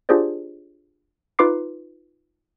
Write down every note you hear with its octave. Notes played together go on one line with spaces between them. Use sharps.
D4 F4 G4 G#4 C5 D5
D#4 F4 B4 C6 D6 C7